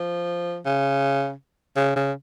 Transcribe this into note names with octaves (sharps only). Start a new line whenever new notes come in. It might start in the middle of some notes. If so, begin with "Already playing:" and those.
Already playing: F3
C#3
C#3
C#3